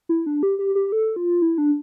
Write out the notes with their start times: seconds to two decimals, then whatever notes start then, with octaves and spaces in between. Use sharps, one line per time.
0.09 E4
0.26 D4
0.43 G4
0.59 G4
0.75 G4
0.92 A4
1.16 F4
1.42 E4
1.58 D4